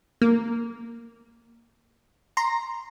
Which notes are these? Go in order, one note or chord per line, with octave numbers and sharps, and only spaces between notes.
A#3
A#5 C6